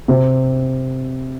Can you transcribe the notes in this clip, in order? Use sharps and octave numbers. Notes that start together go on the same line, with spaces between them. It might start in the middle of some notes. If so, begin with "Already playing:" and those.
C3